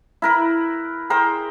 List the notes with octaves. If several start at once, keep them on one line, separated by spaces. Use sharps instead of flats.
E4 A#4 B4
G#4 A#4 C5 G5